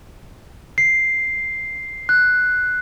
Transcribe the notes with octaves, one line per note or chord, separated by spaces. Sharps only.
C7
F#6